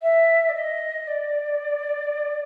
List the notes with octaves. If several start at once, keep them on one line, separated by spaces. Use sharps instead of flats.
E5
D5
D#5
D5